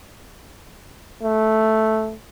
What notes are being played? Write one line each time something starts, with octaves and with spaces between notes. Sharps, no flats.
A3